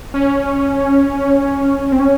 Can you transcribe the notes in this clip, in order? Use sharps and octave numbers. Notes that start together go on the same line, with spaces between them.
C#4
C4
C#4